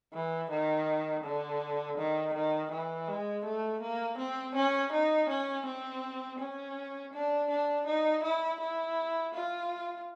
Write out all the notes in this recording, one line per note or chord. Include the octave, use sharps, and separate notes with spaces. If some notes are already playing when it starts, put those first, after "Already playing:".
E3
D#3
D3
D#3
D#3
E3
G#3
A3
A#3
C4
C#4
D#4
C#4
C4
C#4
D4
D4
D#4
E4
E4
F4